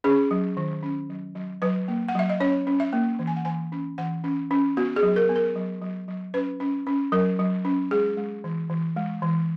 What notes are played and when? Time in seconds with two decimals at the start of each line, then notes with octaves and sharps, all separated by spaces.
0.04 C#4 G#4
0.31 F#3
0.57 D#3
0.83 C#4
1.10 F#3
1.35 F#3
1.62 F#3 B4
1.88 A#3
2.08 F#5
2.15 F#3 E5
2.30 D#5
2.40 C#4 C#5
2.67 C#4
2.80 E5
2.93 A#3
3.19 E3
3.27 G#5
3.36 F#5
3.45 E3 G#5
3.72 C#4
3.98 E3 F#5
4.24 C#4
4.51 C#4
4.77 B3 F#4
4.96 G#4
5.03 F#3
5.16 A#4
5.29 B3
5.36 A#4
5.55 F#3
5.82 F#3
6.08 F#3
6.34 C#4 B4
6.60 C#4
6.87 C#4
7.12 F#3 A#4
7.39 F#3
7.65 C#4
7.91 G#3 G#4
8.17 G#3
8.44 E3
8.70 E3
8.96 G#3
9.22 E3